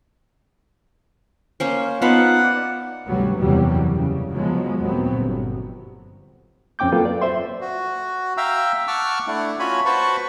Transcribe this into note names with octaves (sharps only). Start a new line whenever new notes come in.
A#3 C#4 C5
B3 D#4 F4 F5 F#5 A5 B5
D5
G#1 D2 C3 F#3 G3 B3
F#1 E2 C3 E3 F#3 G3
C#3
F3 F#3 G#3 B3
D#2 A#2 F#3 B3 C4
G1
F2 C4 C#4 G5 D6 G6
F#3 A#3 F4 A4 B4
D5
C5 E5 C6
F#4
E5 F5 G5 A#5 E6
F#5 A5 C#6 D6 E6 F6
A3 D4 E4 F#5
C#4 F4 F#4 C#5 G#5 B5
F#4 B4 C5 A5 B5 C#6